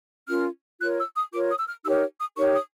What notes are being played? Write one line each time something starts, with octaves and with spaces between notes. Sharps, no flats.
C#4 F4 A#4 F6
F4 A#4 C#5 F#6
E6
D#6
F4 A#4 C#5 D6
D#6
E6
F6
D#4 G4 A#4 C#5 E6
D#6
D#4 G4 A#4 C#5 C#6
D#6